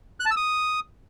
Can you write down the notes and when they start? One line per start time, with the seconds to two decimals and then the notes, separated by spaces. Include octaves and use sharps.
0.20 F#6
0.26 A5
0.31 E6
0.37 D#6